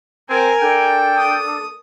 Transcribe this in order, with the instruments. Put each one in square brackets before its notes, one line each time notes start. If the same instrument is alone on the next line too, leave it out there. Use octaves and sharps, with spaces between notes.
[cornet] C4 [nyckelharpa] A#4 G#5
[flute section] D4 A4 [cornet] G5
[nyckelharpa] D#6